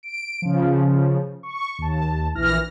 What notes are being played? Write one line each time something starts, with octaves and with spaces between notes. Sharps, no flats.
D7
C#3 F3
C#6
D#2 A5
A#1 E3 F6 A#6